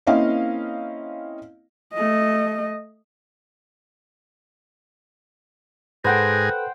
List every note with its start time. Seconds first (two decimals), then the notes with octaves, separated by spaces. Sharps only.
0.07 A#3 C4 C#4 E4 D#5 F5
1.94 A3 D#5
6.04 G#2 G#4 A4 B4 C5 F#5 G5 A#6